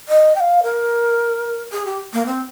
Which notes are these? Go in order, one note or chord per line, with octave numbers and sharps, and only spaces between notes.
D#5
G5
F5
A#4
G#4
G4
A#3
C4